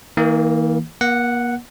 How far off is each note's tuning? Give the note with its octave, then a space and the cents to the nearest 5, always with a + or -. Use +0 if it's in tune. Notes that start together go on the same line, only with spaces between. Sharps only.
E3 -45 A#3 +0
A#3 +40 F#5 +0